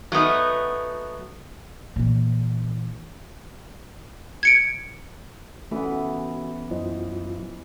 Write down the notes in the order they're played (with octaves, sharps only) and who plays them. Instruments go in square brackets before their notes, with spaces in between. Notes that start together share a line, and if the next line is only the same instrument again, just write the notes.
[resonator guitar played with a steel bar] F#3 A3 B3 D#4
[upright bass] A#2 E3
[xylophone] G#6 C#7 D7
[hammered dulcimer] E3 B3 [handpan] A3 C#4 [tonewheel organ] F#4
[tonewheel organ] F#2 F#3 F4 [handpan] E4 C5 D#5